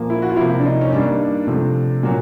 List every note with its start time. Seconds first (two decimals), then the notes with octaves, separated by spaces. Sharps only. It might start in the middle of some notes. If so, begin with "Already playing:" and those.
Already playing: A#2 F3 A#3
0.10 E4
0.22 F#4
0.29 F4
0.36 C3 F3 A#3 E4
0.59 D4
0.64 D#4
0.81 C#4
0.91 G2 D#3 G3 A#3 D4
1.47 C3 F3 A3
2.03 A#2 F#3 A#3